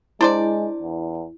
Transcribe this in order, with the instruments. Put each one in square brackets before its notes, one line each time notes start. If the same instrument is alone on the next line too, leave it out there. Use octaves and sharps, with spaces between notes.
[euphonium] G#3 [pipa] D4 C5 D5 [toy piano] E4
[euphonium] E2